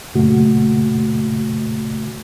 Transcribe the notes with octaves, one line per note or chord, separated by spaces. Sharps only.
F#2 A#2 C#3 A3 F#4